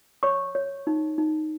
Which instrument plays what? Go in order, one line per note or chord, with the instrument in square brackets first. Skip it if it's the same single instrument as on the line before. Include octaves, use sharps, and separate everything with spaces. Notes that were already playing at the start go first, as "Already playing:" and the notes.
[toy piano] C#5 C#6
C#5
D#4
D#4